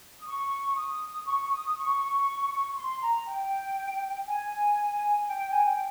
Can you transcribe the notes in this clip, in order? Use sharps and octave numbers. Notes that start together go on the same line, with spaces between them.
D#6
C#6
D#6
C#6
D#6
C#6
C6
A#5
G5
G#5
G5
G#5
G5